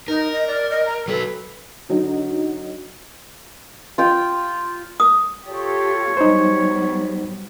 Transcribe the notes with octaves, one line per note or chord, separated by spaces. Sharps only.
D#4 A#4
D#5
D5
D#5
A#5
F#3 A4 B4
D3 F#3 D#4
F4 G5
D#6
F4 G4 A4 C#5
F#3 G3 B3 D#4 C5